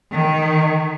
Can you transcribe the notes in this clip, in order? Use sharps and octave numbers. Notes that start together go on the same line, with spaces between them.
D#3